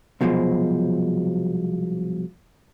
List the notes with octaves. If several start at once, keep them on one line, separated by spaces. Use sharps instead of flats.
C2 B2 F3 F#3 G#3